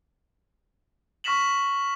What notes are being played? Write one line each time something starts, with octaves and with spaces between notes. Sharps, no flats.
C#6 F6 A#6 B6 E7 F#7